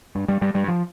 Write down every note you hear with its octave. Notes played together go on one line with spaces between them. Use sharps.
G2 G3
G2 G3
G2 G3
G2 G3
F3